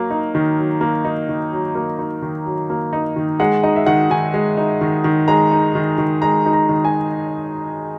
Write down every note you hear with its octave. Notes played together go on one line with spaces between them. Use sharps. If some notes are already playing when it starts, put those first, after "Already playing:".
Already playing: F#3 A#3
D#4
D#3
F#3
A#3
D#4
D#3
F#3
A#3
D#4
D#3
F#3
A#3
D#4
D#3
G#3 F#5
D#4 D#5
E5
D#3 F#5
D#3 G#5
G#3
D#4
D#3
D#3
G#3 A#5
D#4
D#3
D#3
G#3 A#5
D#4
A#5
D#3
G#5